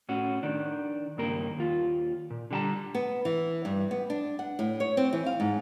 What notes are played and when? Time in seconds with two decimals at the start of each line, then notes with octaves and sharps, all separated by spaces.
0.09 A2 C#4 F#4
0.43 D#3 D4
1.17 C#2 G2 D#3 A#3 A#4
1.58 D#2 F4
2.30 A#2
2.51 D3 G3 G5 A5 A#5
2.95 B3
3.25 E3
3.65 G2
3.91 B3
4.10 D4
4.39 F#5
4.59 A2
4.80 C#5
4.97 C4
5.13 E3
5.26 F5
5.40 G#2